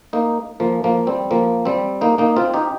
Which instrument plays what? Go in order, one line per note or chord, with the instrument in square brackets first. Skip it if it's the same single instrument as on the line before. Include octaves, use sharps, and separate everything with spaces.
[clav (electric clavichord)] A#3 D#4
F3 A#3
F3 A#3
G3 C4
F3 A#3
G3 C4
A#3 D#4
A#3 D#4
C4 F4
D#4 G4